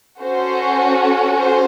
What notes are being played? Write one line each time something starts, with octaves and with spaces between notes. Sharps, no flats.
C#4 F#4 A4 C5
C5